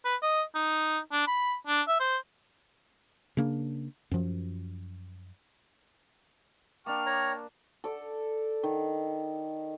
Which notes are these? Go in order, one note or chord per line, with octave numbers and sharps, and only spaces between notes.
B4
D#5
D#4
D4
B5
D4
E5
C5
C#3 A#3 D4
F#2 F3
A#3 D4 G5 A5 C#6 F6
C#5 A#5
A4 D5
D#3